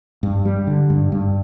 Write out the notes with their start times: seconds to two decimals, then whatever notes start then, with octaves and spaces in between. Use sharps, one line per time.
0.23 G2
0.45 G3
0.67 D3
0.90 G2
1.12 G2